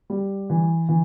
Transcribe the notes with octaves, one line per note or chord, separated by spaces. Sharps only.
G3
E3
E3